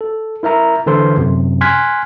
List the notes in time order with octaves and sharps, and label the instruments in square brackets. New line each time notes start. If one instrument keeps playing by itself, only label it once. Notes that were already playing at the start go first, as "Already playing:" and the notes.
[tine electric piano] A4
E4 A#4 E5 A#5
D3 E3 A4 C5 C6
F#2 C3
G#5 C6 F6 F#6 G#6 B6